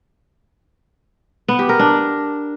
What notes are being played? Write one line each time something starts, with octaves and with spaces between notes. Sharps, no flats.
B3
G4
A#4
D4